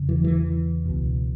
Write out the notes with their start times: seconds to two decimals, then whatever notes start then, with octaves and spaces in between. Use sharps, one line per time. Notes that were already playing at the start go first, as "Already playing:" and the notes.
Already playing: E2 C#3
0.09 E3
0.24 E3
0.85 C#2 B2